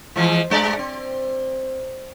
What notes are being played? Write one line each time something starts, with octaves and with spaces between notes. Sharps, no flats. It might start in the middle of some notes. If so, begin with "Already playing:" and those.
E3 F3 G#3
G2 G#3 D5
C4